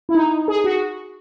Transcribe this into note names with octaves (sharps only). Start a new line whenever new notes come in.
E4
D#4
G#4
F#4